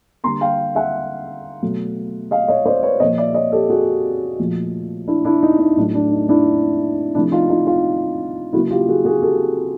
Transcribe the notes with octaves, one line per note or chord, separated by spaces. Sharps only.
D3 G3 A#3 A#5 C6
F5 G5
E5 F#5
B2 F#3 A3
D#5 F5
C#5 D#5
C5 D5
B4 C#5
A#2 F3 A#3 C#5 D#5
D5 E5
C#5 D#5
G4 A4
F#4 G#4
A#2 F3 A3
D4 E4
D4 E4
D#4
D#4
A2 F#3 A3 D4
D4
D#4
D4 E4
C3 F3 A3 D4 E4
D#4 F4
D#4 F4
D#4 F4
C#3 F#3 A#3 E4 F#4
F4 G4
F#4 G#4
F#4 G#4
G4 A4